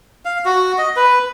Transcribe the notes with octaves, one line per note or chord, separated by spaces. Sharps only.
F5
F#4
D#5
B4